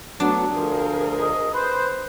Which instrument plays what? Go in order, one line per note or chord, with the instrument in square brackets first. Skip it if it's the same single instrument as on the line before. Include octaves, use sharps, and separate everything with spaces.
[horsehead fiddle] F#3 A3 [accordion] B3 [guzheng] D4
[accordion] D2 F3 [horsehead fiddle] G#4 A#4
[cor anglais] D#5
[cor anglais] B4 [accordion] C5